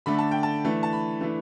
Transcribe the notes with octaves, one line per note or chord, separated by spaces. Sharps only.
D3 A3 D4 B5
A5
G5
A5
E3 A3 D4
A5
B5
E3 A3 D4